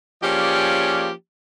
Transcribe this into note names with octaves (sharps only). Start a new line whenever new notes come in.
F3 A#3 C#4 G4 G#4 D5